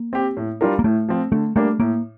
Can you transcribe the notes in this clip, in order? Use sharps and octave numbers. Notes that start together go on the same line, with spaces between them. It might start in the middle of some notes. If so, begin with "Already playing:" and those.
Already playing: A#3
C4 G4
A2
G3 D4 F4 A#4
A#3
A2 A3
F3 C4
D3 A3
G3 A3 A#3 D4
A2 A#3